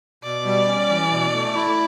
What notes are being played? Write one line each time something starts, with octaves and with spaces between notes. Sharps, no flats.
B2 D5
G3
C#4
E3
B2
A3
E4